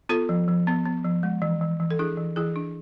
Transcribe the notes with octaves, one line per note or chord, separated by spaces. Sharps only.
B3 F4 A4
F3
F3
B3
B3
F3
G#3
E3
E3
E3
A4
D4 E4 G#4
E3
E3 E4 G#4
D4